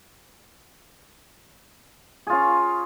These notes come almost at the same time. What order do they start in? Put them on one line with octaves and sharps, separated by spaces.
G#4 F4 C#4